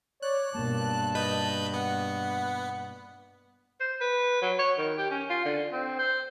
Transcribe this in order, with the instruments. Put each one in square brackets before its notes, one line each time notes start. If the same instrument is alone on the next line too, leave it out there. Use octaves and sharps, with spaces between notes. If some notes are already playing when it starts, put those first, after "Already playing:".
[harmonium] C#5 D5 [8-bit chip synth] F#6
[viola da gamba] G2 [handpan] B2 A#3 [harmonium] A5
[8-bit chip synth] B4 B5 G6 [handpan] D#5
[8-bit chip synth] B3 [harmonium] F#5
[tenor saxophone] C5
B4
F#3
C#5
D#3
G4
C#4
F4
D3
C4
C5